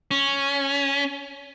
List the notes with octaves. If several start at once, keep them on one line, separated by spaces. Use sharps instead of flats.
C#4